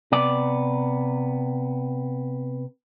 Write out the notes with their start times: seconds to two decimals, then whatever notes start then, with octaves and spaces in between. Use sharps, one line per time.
0.12 C3 B3 D5